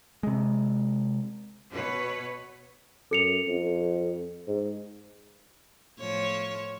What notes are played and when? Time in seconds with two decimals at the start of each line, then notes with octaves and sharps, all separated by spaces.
0.23 C3 G#3
1.72 B2 B4 C#5
3.11 F#2 A4 C#7 F7
3.48 F2
4.47 G#2
6.00 A2 F3 C#5